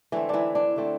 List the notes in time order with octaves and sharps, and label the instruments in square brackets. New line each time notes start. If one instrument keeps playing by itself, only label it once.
[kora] D3 E3 A3 C4 E4
E3 D4 E4
D4
D3 A3 C4